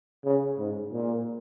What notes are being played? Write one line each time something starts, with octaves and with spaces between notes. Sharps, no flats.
C#3
G#2
A#2